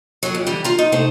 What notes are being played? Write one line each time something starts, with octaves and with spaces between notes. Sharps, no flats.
F#3 C#4 G4 G#4
F2
D3 E3 G3
F4 A#5
D#4
C3 A3 D#4 C5